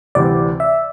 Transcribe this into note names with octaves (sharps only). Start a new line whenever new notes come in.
D2 C3 E3 G3 C4 D5
E5